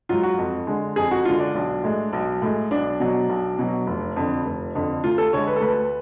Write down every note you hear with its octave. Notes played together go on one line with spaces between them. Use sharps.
G#2 F#3 F4
F#4
F2
D3 G#3
F2 G#4
F#4
D3 G#3 F4
D4
B1
A2 G#3
B1
A2 G#3
B1 D4
B2 F#3
B1
B2 F#3
F1
F2 D3
F1
F2 D3
D2 F4
A4
D3 G#3 C#5
B4
A4
D2 B4